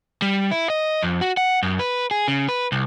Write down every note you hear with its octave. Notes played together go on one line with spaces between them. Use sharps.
G3
E4
D#5
F2
F#4
F#5
F#2
B4
G#4
C#3
B4
C2